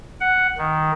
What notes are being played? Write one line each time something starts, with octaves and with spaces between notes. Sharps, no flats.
F#5
D#3